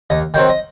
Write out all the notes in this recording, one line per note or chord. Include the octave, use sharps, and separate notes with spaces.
D#2 D#5
D#3 F#3 C4 G5
D#5